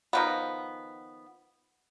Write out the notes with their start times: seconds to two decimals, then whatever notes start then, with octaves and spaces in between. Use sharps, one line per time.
0.13 D#3 F3 B3